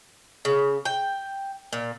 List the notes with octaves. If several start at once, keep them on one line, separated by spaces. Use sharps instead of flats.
C#3
G5
A#2